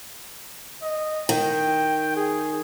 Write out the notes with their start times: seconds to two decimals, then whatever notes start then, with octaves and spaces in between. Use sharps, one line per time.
0.82 D#5
1.29 D#3 G5
2.16 G#4